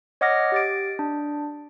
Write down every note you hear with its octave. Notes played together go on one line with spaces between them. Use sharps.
C#5 D#5 F#5 D6 F6 A#6
G4 A6 D7
D4